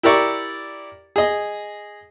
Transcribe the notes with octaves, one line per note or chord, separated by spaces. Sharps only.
E4 G4 A#4 D5 C#6
G#4 D#5